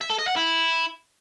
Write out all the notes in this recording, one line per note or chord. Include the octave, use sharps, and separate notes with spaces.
E5
A4
D#5
F#5
E4